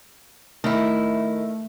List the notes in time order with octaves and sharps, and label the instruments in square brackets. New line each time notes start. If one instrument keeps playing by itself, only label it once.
[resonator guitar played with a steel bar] D#3 E4 [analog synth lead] A3